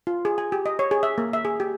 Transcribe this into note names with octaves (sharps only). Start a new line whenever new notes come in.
F4
G#4
G#5
G4
D#5
C#5
G#4
E5
A#3
E5
G#4
G4